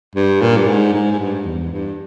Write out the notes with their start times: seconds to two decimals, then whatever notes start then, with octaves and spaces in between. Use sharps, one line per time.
0.15 G2
0.42 A#2
0.57 G2
0.68 G#2
0.93 G#2
1.12 G#2
1.19 G2
1.45 E2
1.71 G2